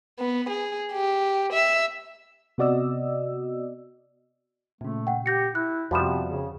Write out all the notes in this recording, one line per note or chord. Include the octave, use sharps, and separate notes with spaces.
B3
G#4
G4
E5
C3 B3 F#4 D5 D#5 E6
A#2 C#3 A3
F#5 G5
G4 G6 A#6 C#7
E4 F#6
F2 C3 F3 G3 B3 F#4 E7
C#3